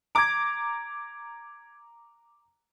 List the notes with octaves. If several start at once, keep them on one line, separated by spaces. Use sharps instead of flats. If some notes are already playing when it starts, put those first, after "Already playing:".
A#5 D6 G#6 D7